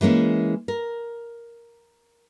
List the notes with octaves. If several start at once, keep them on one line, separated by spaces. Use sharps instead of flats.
E3 G#3 A#3 C#4 E4
A#4